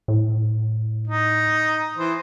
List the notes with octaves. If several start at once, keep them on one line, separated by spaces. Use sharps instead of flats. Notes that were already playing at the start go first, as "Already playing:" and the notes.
A2
D#4
E3 C5